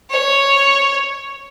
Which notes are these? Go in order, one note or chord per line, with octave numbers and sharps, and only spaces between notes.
C#5